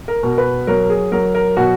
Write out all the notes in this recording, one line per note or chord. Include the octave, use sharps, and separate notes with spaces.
A#4
B2
B4
F#3 A#4
G#4
F#3 A#4
A#4
B2 F#4